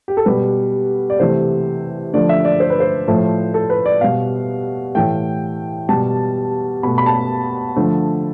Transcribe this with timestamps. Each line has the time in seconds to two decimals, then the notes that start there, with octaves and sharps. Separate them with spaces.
0.08 G4
0.17 A4
0.26 B2 G3 B4
1.10 D5
1.20 C3 E3 A3 C5
2.13 D3 F3 A3 D5
2.29 E5
2.45 D5
2.60 C5
2.70 B4
2.80 C5
3.07 A2 F3 A3
3.54 A4
3.70 B4
3.86 D5
4.01 B2 G3 F5
4.95 A2 E3 A3 G5
5.89 B2 G3 A5
6.83 B2 A3 B5
6.98 B5
7.06 A5
7.76 D3 F3 A3